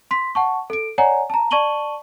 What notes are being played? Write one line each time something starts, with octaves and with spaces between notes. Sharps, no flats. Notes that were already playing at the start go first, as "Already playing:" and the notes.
C6 B6
F#5 A5 C#6
A4 D7
C#5 D5 F#5 G#5 A#5
A5 A#5
D5 A5 C#6 D#7 F#7 G7